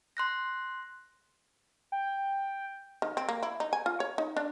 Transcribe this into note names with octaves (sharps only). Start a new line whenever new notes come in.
C6 F#6 A#6
G5
D#3
C4
A#3
E4
D#4
G#5
F4
C#5
D#4
D4